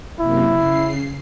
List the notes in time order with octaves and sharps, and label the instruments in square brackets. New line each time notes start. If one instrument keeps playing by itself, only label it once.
[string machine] F#2 C3 A#3 [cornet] E4
[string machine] C#3 C7